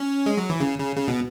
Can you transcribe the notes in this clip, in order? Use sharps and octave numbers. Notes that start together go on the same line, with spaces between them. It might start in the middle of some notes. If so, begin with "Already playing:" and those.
Already playing: C#4
G#3
F#3
E3
C#3
C#3
C#3
B2